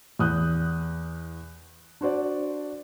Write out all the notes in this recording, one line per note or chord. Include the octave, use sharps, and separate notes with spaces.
E2 D#6 F#6 G6
D4 F#4 C5 D5